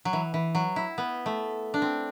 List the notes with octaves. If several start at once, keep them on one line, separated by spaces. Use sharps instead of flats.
F#3
E3
E3
F#3
E4
B3
A3
D4
C4